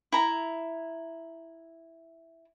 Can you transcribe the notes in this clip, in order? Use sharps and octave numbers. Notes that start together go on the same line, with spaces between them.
E4 A#5